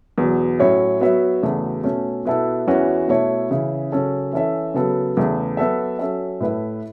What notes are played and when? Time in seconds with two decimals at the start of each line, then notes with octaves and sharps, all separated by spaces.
0.18 E2 B2 F#3
0.59 A2 F#3 C#4 E4 C#5
1.00 F#3 B3 F#4 C#5 E5
1.43 E2 C#3 A3 F#4
1.84 B2 A3 C#4
2.25 B2 B3 E4 A4 E5
2.67 E2 E3 C#4 F#4
3.08 B2 A3 E4 C#5
3.50 C#3 E3 C#4 E4
3.92 C#3 F#3 C#4 A4
4.33 E3 C#4 A4 E5
4.74 C#3 F#3 B3 A4
5.17 E2 C#3 A3
5.57 F#3 B3 F#4 A4 E5
5.99 F#3 C#4 A4 E5
6.40 A2 A3 E4 B4 E5